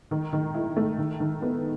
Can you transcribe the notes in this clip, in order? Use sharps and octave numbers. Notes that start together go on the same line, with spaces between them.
D#3
D#3
E4
A3
D#3
D#3
B3